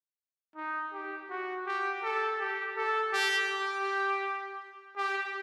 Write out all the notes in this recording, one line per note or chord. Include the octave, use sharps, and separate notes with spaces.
D#4
G4
F#4
G4
A4
G4
A4
G4
G4
G4